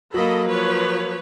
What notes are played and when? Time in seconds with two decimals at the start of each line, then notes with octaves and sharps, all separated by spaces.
0.14 F#3 A#3 A4 D#5 B5
0.48 F3 B4 C#5